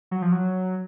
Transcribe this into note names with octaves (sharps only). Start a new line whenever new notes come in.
F#3
F3
F#3